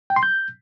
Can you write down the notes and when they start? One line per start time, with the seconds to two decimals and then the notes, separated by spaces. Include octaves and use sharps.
0.10 G5
0.16 C6
0.23 G6